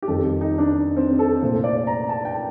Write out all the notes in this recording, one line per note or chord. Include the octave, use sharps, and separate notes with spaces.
G4
F2 D#3 G3 A4
G4
D#4
D4
C4
A4
C2 A#2 A3 C5
D5
A#5
A5
G5